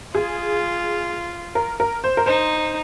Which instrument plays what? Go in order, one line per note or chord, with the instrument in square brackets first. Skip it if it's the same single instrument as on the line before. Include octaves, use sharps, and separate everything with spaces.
[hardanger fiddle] F4 [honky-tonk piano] G#4
[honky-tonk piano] A#4
A#4
C5
A#4
[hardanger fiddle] D#4 [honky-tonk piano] C5